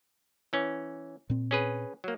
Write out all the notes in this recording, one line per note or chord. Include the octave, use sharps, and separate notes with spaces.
E3 C#4
A#2 C4
C#4 G#4 B4
F#3 A#3